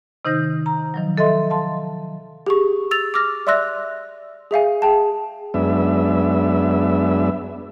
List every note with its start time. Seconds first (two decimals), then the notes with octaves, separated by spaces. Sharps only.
0.25 C3 D#3 D#4 C5 G6 A#6
0.66 A#5
0.94 D#3 F3 F#3
1.18 A4 D#5 E5 C6
1.50 F5 A5 C6
2.46 G4 G#4 C#6
2.91 E6 A6 F7
3.14 D6 E6 F6 A#6
3.47 D5 E5 C6 E6 F#6 A#6
4.51 G#4 E5 F5 G#5
4.82 G#4 G5 A5
5.54 F#2 G#3 B3 D4 E5